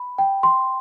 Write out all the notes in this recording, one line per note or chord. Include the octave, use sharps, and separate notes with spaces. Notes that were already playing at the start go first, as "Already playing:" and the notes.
Already playing: B5
G5
C6